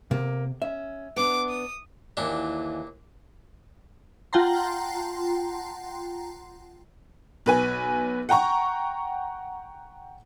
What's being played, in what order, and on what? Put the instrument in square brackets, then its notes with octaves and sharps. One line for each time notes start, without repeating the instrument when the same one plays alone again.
[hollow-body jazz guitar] C3 [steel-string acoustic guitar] A#3
[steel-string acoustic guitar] C#4 [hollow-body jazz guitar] E5
[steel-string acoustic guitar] B3 D4 [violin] D6
[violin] D#6
[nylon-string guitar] D#2 E3 [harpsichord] A#2 D4
[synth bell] F4 F#5 G5 A5 A#5 C6
[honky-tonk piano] B1 B4 G#5
F#5 G5 A#5 C#6